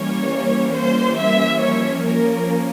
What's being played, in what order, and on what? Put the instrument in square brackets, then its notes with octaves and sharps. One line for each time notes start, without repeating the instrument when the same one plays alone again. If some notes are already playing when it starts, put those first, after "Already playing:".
Already playing: [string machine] E3 G3 A#3 C#4 [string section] C#5
[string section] C5
E5
[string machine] F3 A#3 C#4 [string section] C#5
[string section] A#4